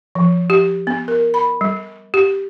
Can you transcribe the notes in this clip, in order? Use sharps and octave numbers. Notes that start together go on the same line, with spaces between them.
F3
G4
B3
A#4
B5
G3
G4